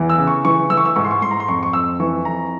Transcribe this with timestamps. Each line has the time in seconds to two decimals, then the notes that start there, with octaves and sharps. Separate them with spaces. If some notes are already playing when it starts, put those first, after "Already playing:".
Already playing: E2 E3
0.10 E6
0.18 C#3
0.27 C#6
0.45 E3 C#6
0.70 E3 E6
0.77 C#6
0.85 E6
0.96 G#2 C#6
1.04 C6
1.11 C#6
1.22 G#2 C6
1.31 A#5
1.40 C6
1.48 F2 C#6
1.63 C#6
1.73 F2 E6
2.00 E3 C#6
2.25 F2 A#5